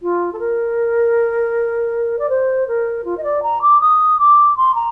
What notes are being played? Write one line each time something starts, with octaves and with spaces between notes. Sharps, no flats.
F4
A4
A#4
D5
C5
A#4
F4
D#5
D5
A#5
D6
D#6
D6
C6
A#5